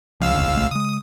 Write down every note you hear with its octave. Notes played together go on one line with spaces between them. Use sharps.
C#2 F3 F5 E6
F1 D#2 D3
A#1 A3
C#3 G#3 D#6